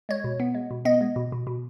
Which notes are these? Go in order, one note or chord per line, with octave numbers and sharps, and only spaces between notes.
G#3 C#5
B2
B3
G#3
B2
B3 D#5
G#3
B2
B2
B2